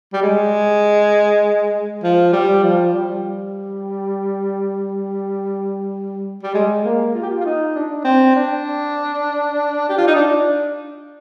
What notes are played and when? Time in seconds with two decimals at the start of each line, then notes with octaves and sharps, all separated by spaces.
0.13 G3
0.22 G#3
2.04 F3
2.33 G3
2.64 F3
2.94 G3
6.43 G3
6.54 G#3
6.85 A#3
7.14 F4
7.22 G4
7.30 F4
7.40 F4
7.45 D#4
7.75 D4
8.05 C4
8.36 D4
9.89 G4
9.98 F4
10.07 D#4
10.16 D4